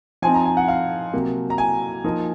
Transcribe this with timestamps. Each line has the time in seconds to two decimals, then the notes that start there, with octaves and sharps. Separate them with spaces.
0.22 F3 C4 D#4 G#5
0.34 A#5
0.46 G#5
0.57 F#5
0.68 F5
1.13 C3 F#3 A#3
1.50 A#5
1.58 G#5
2.04 F3 A#3 D#4